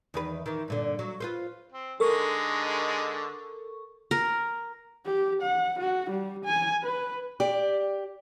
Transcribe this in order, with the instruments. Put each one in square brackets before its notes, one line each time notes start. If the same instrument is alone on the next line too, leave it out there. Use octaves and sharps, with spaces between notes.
[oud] E2 D#3 B4
D#3 E3
G2 A#2 D3
F#3
F4 B4 C5
[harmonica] C4
[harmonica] D3 G#3 D#4 [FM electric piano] A4 A#4 C#6
[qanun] A#4
[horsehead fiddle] G4
F#5
F#4
G3
G#5
B4
[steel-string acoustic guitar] G4 D5